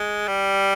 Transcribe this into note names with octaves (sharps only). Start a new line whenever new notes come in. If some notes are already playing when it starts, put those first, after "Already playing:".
Already playing: G#3
G3